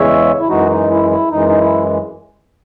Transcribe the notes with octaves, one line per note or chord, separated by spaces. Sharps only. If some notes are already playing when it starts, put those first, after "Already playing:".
Already playing: E2 C#3 E3 G#3 C#5 E5
E4
F#2 E3 G#3 D#4 F#4
D#4
E4
E4
F#2 E3 G#3 D#4
D#4
E4